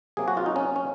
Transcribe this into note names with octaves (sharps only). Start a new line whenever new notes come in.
C3 F#3 A#3 G#4
F#4
F4
D#4
C#4
C#4